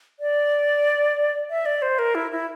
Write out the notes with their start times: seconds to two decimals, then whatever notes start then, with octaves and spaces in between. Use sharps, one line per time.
0.20 D5
1.50 E5
1.66 D5
1.82 C5
1.99 A#4
2.15 E4
2.31 E4